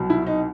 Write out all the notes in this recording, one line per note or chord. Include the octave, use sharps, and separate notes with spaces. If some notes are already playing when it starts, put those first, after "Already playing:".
Already playing: C2 B2 F#3
E4
D#4